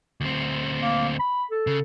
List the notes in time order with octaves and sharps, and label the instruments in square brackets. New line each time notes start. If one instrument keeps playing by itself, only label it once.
[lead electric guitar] D2 C4
[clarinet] A#3
B5
A4
[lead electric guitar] C#3